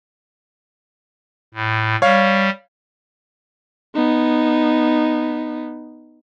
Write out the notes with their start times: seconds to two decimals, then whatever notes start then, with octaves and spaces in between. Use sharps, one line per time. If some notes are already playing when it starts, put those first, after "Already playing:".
1.54 A2
2.02 G3 C#5 F5
3.95 B3 D#4